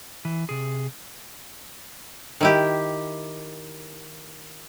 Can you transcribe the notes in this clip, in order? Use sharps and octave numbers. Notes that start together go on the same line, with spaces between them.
E3
C3 G#4
D#3 E4 G4